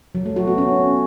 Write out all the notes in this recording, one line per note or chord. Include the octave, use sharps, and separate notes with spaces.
F#3
A3
F#4
B3
C#4